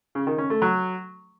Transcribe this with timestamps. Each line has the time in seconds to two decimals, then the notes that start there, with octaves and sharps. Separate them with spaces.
0.15 C#3
0.27 D#3
0.38 C#4
0.50 A3
0.62 F#3